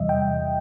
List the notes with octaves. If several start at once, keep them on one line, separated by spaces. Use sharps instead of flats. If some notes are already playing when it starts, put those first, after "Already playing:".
Already playing: E2 C3 E3 G3 D#5 E5
G5